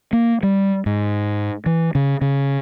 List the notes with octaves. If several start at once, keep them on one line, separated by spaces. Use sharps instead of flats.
A#3
G3
G#2
E3
C#3
C#3